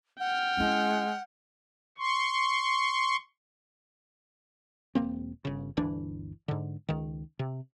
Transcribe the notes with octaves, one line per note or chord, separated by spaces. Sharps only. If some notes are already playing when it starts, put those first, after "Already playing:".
F#5 G5 F6
G#3 C#4 E4
C6 C#6
E1 A#3 C4
G1 C#3
G1 D2 E3 D4
G#2 D3
C#2 D#3
C3